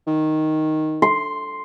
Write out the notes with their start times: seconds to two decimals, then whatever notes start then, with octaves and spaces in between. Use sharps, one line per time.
0.07 D#3
1.02 C6